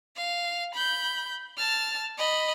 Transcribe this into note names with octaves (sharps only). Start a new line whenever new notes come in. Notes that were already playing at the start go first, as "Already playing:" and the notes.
F5
B5 G6
A5 F6
D#5 B5